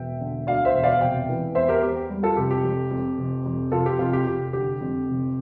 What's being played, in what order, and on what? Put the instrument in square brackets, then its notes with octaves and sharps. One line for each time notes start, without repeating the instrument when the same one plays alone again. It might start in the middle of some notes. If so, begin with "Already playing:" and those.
Already playing: [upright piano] E1 E5 G5
D3
D2 D5 F5
C5 E5
E1
D5 F5
F1 E5 G5
E3
E2 C5 E5
G4 A#4
E2 G4
G4
G3
F4 A4
F1 G4
G4
F2
F2
F1
F2
F1 F4 A4
G4
F1 F4
G4
F1 G4
D3 G4
F2
F1